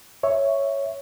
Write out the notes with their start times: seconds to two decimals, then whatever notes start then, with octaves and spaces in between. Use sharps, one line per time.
0.23 C#5 E5